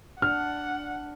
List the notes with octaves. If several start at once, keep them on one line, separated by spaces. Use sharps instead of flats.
D4 F#5 F6